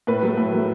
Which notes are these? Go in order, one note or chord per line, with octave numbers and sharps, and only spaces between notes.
A2 B4
F#3 A3
A2
F#3 A3